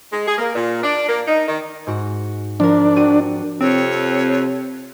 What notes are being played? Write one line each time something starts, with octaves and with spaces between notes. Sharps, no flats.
G#3
G#4
A#3
A#2
D4
A#3
D#4
D#3
G#2 F#4
F3 D4 A#4
C4 F#4 D#7
F2 C3 C4 C#5